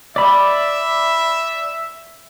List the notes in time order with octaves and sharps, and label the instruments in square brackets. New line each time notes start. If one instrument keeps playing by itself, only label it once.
[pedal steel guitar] D5 B5 [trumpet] E5